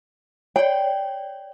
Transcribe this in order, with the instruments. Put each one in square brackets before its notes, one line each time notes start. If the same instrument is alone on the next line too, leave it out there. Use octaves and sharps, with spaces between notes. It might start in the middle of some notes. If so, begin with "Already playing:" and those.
[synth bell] C#5 D5 [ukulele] G5